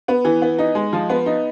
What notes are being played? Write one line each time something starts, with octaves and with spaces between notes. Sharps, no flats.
B3
E3
B3
D#4
G#3
F3
B3
D#4